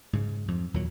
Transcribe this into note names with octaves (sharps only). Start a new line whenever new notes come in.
G#2 C#3
F2
D#2 A#2 F#3